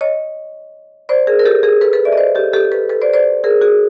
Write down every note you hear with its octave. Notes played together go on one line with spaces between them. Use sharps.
C#5 D#5
C5 D5
G#4 A#4
A#4
G4 A4
G#4 A#4
A4 B4
A4 B4
D5 E5
D#5
C5 D5
G4 A4
G4 A4
A4 B4
A4 B4
C5 D5
C5 D5
G#4 A#4
F#4 G#4